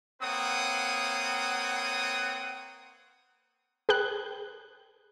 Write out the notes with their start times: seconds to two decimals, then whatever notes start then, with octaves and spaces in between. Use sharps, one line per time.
0.21 A#3 C4 B4 C#5 F#5 D#6
3.89 G#4 B4 G5 F#6